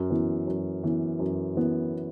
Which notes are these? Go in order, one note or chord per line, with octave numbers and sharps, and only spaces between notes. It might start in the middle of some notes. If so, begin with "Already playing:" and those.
Already playing: F#2
E3 B3
F#2
E3 B3
F#2
E3 B3